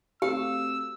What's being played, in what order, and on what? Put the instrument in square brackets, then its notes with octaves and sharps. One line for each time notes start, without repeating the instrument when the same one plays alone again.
[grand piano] A3 C4 F#4 [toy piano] G4 [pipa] F5 [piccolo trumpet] E6